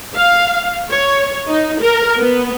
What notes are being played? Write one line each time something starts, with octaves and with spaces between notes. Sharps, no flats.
F5
C#5
D#4
A#4
B3